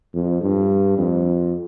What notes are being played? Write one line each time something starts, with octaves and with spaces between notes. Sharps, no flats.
F2
G2
F2